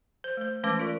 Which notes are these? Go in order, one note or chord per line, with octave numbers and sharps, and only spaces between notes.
C5
A3 C5
E3 G#3 A3 C#4 B4 D6
F4 A#4 D5